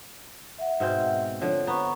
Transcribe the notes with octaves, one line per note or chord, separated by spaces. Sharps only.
E5 F#5
G#2 B2 C4
D3 F3 C#5
B3 A#5 C#6